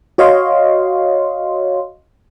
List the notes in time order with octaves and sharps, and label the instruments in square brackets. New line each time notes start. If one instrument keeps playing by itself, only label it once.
[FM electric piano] F#4 C#5 D#5 F5 C6